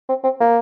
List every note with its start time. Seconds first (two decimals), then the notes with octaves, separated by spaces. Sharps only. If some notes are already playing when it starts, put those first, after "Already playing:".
0.09 C4
0.24 C4
0.40 A#3